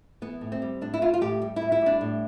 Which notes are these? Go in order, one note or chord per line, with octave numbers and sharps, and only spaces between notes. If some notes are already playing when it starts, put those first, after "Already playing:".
E3 B3
A2
C4
G3
A2 D4
E4
E3 F4
F4
A2 G4
G3
E4
A2
E4
G3 D4
A2